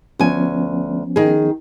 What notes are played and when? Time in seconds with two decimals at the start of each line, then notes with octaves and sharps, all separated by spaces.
0.19 D2 F3 B3 C#4 G#5
1.16 D#3 G#4